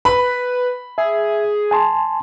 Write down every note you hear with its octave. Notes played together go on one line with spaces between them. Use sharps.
B4 B5
G#4 E5
G#5 A5 C6